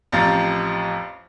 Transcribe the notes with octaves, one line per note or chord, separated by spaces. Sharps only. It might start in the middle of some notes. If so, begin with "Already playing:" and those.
A1 F2 G4 F5 A#5 A6